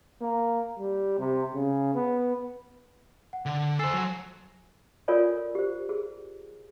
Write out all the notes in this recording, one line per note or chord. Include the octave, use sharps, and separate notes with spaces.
A#3
G3
C3
C#3
B3
F#5
D3
A4 C5 G#5 E6 C7
F#3
F4 A4 A#4 C#5 D5 G#5
G4 C5
G#4